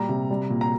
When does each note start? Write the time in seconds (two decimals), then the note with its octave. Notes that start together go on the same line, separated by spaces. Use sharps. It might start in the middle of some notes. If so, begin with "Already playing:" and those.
Already playing: A#2 G3 A#5
0.09 C3
0.30 G3
0.50 A#2
0.61 A#5